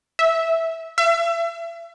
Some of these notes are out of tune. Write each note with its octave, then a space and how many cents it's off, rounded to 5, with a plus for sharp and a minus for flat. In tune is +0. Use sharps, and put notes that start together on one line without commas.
E5 -5
E5 +40